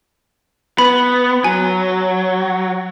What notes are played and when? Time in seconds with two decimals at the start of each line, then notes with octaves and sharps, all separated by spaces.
0.78 B3 B5
1.44 F#3 G#5